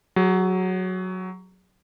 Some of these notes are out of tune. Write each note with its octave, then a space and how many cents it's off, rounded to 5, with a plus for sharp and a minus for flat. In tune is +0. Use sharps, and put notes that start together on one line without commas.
F#3 +0 G#4 -30